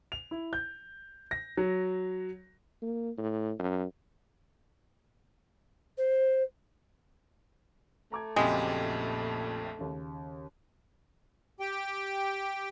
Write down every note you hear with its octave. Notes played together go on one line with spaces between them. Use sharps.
F7
E4
G6
A#6
F#3
A#3
A2
F#2
C5
A3 A#5 D6 G#6
A#1 F2 A#2 C#3 F#3 G#3 G4
D#2 C#3
G4 G5